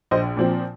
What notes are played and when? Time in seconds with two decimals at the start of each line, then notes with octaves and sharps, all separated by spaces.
0.11 A#1 C5 D#5
0.37 A#2 F3 C4